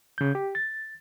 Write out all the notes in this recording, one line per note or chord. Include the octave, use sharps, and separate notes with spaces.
C#3 G6
G4
A6